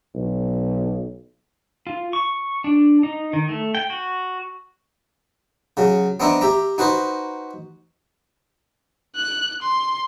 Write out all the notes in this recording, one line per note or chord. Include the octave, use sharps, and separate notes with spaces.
B1
F4
C#6
D4
D#4
D#3
A3
G5
F#4
C#3 F#3
B3 C4 D4 D#5 E5 A#5
G4 E5 A#5
D#4 F#4 B4 C5 D#5
F#6
C6